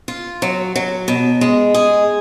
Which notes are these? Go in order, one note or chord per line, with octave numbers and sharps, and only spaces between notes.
F4
F#3
F#3
B2
G#3
G#4